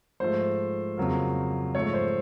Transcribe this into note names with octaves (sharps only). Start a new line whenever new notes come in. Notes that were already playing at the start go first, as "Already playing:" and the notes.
G#2 F3 A3 C5
F2 C#3 F#3 A#3
G#2 F3 A3 C#5
C5